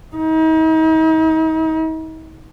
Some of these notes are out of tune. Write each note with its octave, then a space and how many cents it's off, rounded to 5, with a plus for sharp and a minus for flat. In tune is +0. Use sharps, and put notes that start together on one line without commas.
D#4 +40